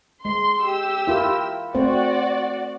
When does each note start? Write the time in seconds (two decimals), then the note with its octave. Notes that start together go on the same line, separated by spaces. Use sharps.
0.25 G#3 C6
0.63 G4 E6
1.07 E4 F4 A#4
1.75 A3 C4 F#4 C5 D5